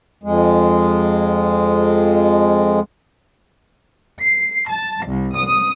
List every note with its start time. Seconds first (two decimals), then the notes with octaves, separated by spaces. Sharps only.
0.24 F2 G#3
4.19 C7
4.69 A5
5.07 C2
5.36 D#6